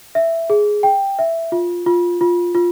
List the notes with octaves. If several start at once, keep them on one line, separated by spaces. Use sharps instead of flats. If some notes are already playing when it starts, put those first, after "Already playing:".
E5
G#4
G5
E5
F4
F4
F4
F4